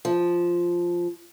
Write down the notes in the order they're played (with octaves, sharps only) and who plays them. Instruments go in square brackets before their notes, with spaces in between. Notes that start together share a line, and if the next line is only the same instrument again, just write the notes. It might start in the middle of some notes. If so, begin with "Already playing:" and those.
[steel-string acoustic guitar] F3